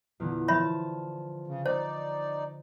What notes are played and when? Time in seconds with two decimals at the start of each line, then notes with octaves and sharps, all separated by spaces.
0.20 E2 A#2 D3
0.48 F3 C#5 E5 A5 B5
1.47 C#3
1.66 D#4 C5 D5